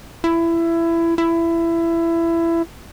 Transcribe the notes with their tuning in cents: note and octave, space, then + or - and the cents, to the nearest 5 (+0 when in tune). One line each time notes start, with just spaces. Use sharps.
E4 +20
E4 +20